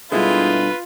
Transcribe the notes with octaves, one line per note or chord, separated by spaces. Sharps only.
G2 B2 D3 G#3 E4 F4 B4